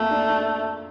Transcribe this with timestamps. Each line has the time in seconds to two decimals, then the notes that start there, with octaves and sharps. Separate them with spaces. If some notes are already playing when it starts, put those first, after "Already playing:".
Already playing: F2 A3 A#3
0.11 D4
0.28 D4